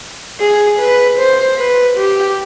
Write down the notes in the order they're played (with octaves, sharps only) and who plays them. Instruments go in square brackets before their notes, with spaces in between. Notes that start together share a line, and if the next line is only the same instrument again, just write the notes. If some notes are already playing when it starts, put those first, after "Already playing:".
[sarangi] G#4
B4
C5
B4
G4